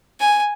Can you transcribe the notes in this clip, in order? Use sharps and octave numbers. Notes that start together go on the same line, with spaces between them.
G#5